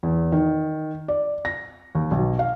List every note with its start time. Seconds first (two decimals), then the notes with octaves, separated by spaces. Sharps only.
0.03 E2
0.32 D#3
1.08 D5
1.45 A#6
1.95 D#2
2.11 B1
2.39 F5